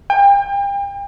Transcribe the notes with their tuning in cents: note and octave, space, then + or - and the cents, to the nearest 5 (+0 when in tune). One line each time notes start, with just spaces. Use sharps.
G5 +35